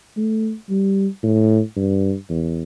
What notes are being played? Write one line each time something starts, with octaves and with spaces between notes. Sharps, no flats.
A3
G3
A2
G2
E2